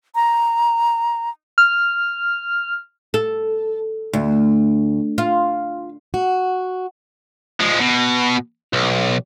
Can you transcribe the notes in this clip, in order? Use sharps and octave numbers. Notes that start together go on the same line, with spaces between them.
A#5
F6
A4
D2
F4
F#4
F3 G#3
B2
B1